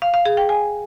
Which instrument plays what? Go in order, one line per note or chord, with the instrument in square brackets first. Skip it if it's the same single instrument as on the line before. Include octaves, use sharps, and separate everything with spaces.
[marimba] F5
F5
G#4
G5
G#5